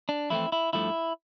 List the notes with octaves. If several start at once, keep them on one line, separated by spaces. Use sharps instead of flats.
D4
F2 E3 A3 C4 E4
E4
G2 F3 A3 E4